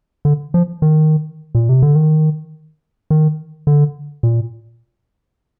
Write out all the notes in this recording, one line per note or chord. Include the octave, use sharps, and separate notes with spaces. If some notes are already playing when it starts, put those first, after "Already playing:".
D3
F3
D#3
A#2
C3
D3
D#3
D#3
D3
A#2